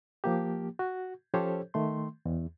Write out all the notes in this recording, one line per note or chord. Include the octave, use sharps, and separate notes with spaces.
F3 A#3 G4
F#4
F3 C#4 G4 A4 C5 C#5
D#3 A3 C6
E2